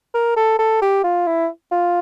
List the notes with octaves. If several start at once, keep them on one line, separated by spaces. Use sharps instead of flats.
A#4
A4
A4
G4
F4
E4
F4